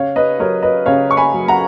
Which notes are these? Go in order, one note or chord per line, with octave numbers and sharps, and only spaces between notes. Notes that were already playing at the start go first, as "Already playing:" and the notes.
Already playing: C#3 C#5 F5
B4 D#5
F#3 A#4 C#5
B4 D#5
C#3 C#5 F5
C#6
G#5 B5
F#3
F#5 A#5